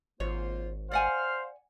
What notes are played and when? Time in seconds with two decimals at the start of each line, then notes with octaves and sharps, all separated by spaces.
0.20 G#1 A#3 F4 C5 C#5
0.92 C5 D5 F5 F#5 G#5 F6